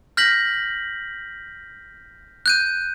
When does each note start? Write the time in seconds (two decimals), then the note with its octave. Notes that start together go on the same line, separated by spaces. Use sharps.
0.17 F6 G6 A#6 B6 F#7
2.46 F#6 G6 D#7